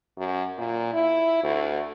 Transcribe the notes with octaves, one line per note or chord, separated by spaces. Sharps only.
F#2
A#2
E4
D2